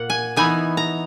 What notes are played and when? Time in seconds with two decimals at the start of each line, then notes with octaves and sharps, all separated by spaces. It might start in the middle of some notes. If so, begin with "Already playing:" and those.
Already playing: A#2 A#3 F#5
0.10 G#5
0.36 E3 B3 D#4 G#5
0.77 A#5